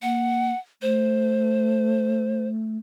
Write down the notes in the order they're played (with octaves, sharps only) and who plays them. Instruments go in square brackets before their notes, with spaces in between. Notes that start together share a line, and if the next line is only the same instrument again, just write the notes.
[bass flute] A#3 [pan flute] F#5
[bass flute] A3 [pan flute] C5